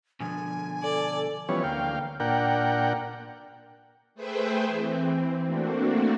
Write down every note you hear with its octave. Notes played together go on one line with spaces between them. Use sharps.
B2 D3 F3 G#5
A4 D5
E3 F3 G3 B3 C#4 C#5
D2 A#3 F5 G5
A#2 D4 A#4 F#5 G5
A3 G#4 B4 C5 E5 G5
E3 C4
A3 A#3 C4 D4 F#4